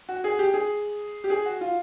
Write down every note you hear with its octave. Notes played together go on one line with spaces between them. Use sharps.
F#4
G#4
G4
G#4
G4
G#4
F#4
F4